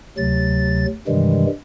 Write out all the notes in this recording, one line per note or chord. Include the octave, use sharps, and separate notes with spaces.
D2 C3 F#3 A6
G2 C3 D#3 E3 G3 G#3